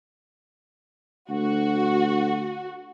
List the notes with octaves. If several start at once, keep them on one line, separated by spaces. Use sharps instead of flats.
D2 F#4